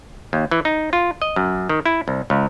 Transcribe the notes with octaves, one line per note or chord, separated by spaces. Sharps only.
D#2
E3
D#4
F4
D#5
F#2
D#3
E4
C2
C#2